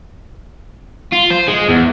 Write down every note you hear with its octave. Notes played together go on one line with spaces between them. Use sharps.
F4
C5
G#3
E2